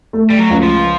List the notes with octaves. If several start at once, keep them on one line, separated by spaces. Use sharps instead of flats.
A3
G3
F#3
C#2
F3